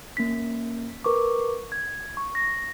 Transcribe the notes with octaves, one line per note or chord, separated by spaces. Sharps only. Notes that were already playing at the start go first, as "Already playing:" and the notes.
A#3 C#4 B6
A#4 B4 C#6 D6
G#6
C#6
A#6